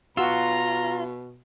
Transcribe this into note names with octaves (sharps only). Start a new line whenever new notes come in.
B2 F4 F#4 A#5 E6